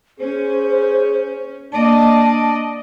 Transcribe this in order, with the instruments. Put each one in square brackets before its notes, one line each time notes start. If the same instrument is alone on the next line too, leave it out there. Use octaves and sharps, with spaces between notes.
[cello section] C#4 [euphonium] G#4 [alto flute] C5
[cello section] A#3 D5 D#5 [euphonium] D4 [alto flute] A5